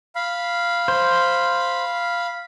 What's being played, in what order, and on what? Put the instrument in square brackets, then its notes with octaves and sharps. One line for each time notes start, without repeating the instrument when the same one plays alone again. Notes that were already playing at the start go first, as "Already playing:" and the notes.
[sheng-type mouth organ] F5 B5
[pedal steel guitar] C5